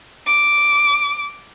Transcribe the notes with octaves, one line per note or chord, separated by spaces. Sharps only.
D6